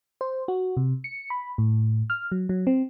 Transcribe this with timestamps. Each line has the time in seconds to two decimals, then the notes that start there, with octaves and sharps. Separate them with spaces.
0.21 C5
0.48 F#4
0.77 C3
1.04 C#7
1.30 B5
1.58 A2
2.10 F6
2.32 F#3
2.49 F#3
2.67 C4